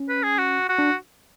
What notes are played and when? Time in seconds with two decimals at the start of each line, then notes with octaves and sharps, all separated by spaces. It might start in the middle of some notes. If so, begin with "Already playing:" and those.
Already playing: C#4
0.09 B4
0.23 G#4
0.38 F#4
0.69 F#4
0.79 D4